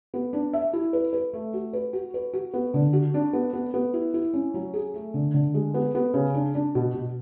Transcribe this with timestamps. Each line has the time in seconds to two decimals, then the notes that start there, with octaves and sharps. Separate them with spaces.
0.14 B3
0.33 D4
0.53 E5
0.73 E4
0.93 B4
1.13 B4
1.33 A3
1.54 F#4
1.73 B4
1.93 F#4
2.14 B4
2.33 F#4
2.54 B3
2.74 D3
2.93 F#4
3.14 D4
3.33 B3
3.53 B3
3.74 B3
3.94 E4
4.14 E4
4.34 C#4
4.54 F#3
4.74 G#4
4.94 A3
5.14 D3
5.34 D3
5.54 G#3
5.74 B3
5.95 B3
6.14 C#3
6.34 D4
6.55 D4
6.75 B2
6.94 B2